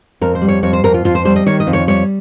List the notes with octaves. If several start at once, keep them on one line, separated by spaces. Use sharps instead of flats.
F2 A#4
C5
G3
C#5
F2 C#5
C5
F2 A#4
F4
F2 F4
C5
G3 C5
D#5
D#3 C#5
D#5
F2
C#5
G3 C#5